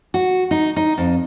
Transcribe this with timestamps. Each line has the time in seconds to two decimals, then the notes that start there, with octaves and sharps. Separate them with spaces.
0.14 F#4
0.51 D#4
0.76 D#4
0.98 F2